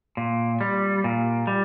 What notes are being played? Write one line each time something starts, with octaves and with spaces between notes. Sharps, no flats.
A#2
G3
A#2
G3